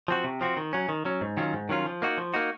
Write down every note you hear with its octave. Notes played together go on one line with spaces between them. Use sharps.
F3 C4 F#4
C3
F3 C4 F#4
D#3
F#3 C#4
D#3
F#3 C#4
G#2
D#3 F#3 C#4 F4
G#2
D#3 F#3 C#4 F4
F3
A#3 D#4 F#4
F3
A#3 D#4 F#4